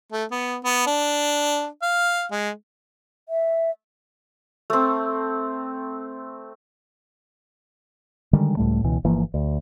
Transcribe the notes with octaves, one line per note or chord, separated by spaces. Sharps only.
A3
B3
B3
D4
F5
G#3
E5
A3 C4
D3 D#3 G3 G#3
C#2 A2 G3 A3
C#2 B2 E3
G1 E3 F3 A#3
D2